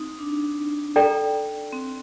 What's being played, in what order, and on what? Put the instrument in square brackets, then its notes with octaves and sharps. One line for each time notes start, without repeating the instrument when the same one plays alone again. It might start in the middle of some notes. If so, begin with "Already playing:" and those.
Already playing: [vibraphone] C4 D#4
D4
[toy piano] A4 D5 G5 A#5
[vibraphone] C4